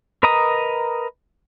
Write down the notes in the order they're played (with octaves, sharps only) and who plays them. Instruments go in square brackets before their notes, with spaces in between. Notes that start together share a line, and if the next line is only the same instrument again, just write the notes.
[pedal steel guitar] A#4 B4 D#5 A#5 D#6